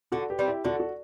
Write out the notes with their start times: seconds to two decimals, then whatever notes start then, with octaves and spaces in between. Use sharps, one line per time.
0.12 D3 F#4 A4
0.30 G4 B4
0.39 G3 C4
0.48 E4 G4
0.65 D3 F#4 A4
0.80 F#4